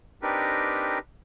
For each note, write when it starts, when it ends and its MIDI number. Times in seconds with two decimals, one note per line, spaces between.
0.23 0.99 60
0.23 0.99 62
0.23 0.99 63
0.23 0.99 67
0.23 0.99 70
0.23 0.99 71